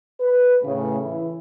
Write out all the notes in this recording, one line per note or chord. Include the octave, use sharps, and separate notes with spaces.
B4
A2 C#3
E3 E4